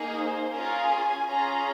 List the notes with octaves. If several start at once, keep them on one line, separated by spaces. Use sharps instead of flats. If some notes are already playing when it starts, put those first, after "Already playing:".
Already playing: A#3 D#4 G#4
C5
C#4 F4 G#4 A#4
G#5
C#4 F4 G#4 A#5